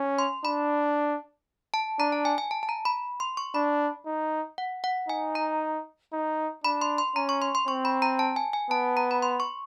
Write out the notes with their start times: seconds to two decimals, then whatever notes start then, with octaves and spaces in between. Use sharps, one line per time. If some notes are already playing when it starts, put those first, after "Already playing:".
Already playing: C#4
0.19 C6
0.45 D4 B5
1.74 A5
1.99 D4 A#5
2.12 A5
2.25 G#5
2.38 G#5
2.51 A5
2.63 A5
2.69 A#5
2.85 B5
3.20 C6
3.37 C#6
3.54 D4 B5
4.06 D#4
4.58 F#5
4.84 F#5
5.09 D#4 G#5
5.35 A#5
6.13 D#4
6.64 D4 B5
6.82 C6
6.98 C6
7.16 C#4 A#5
7.29 C#6
7.42 C6
7.55 C6
7.67 C4 C#6
7.85 B5
8.02 A#5
8.19 A5
8.36 G#5
8.53 G#5
8.71 B3 A5
8.97 A#5
9.11 B5
9.22 C6
9.40 C#6